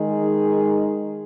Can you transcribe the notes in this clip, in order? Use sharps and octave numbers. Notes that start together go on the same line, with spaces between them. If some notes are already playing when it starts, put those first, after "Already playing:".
Already playing: D#3 G#3 D#4 G#4